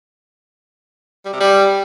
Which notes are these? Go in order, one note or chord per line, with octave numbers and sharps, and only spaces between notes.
G3
C3
G3